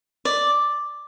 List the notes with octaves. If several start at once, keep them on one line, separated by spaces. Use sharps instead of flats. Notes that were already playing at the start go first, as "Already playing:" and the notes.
D5